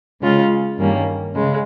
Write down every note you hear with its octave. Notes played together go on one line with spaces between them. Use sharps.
C#3 G#3 C#4 F4
G2 D#3 G3 A#3 C#4
C#3 G#3